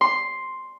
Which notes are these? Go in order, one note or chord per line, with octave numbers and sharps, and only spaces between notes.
C6